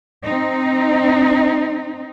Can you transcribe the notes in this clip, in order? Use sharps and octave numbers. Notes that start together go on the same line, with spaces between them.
C4 D#4